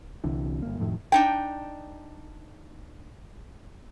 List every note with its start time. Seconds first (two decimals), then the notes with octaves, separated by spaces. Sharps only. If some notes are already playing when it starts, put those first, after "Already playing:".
0.24 C2 D3 E3
0.62 G1 A#3
0.79 F2 A2 D#3 A3
1.12 D4 D#4 G5